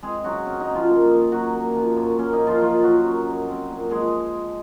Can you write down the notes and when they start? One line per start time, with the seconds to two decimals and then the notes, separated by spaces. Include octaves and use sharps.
0.03 G#3 C4 G#4
0.24 C#3 F#3 F#4
0.46 C4 C#4
0.60 D#4
0.67 C#3
0.75 F3 F4
0.89 A#3
1.11 D#3
1.32 F#3 C#4 F#4
1.54 A#3
1.76 F3
1.96 F#2
2.18 A#3 C#4
2.33 D#4
2.40 F#2
2.47 F3 F4
2.61 F#2 F3 F4
2.83 F#2 F#3 F#4
3.05 F#2
3.26 F#2
3.49 C4
3.70 A#2
3.90 F3 G#3 G#4